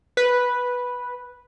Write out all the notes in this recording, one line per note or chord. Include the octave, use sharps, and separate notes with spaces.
B4